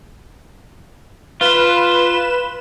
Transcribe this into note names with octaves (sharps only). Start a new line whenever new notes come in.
F4 B4 E7